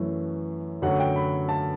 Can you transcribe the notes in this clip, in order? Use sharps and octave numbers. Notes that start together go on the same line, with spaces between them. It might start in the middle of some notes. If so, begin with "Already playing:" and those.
Already playing: F#2 E3 A3
F#2 D3 F#3 A3 F#5
G5
B5
A5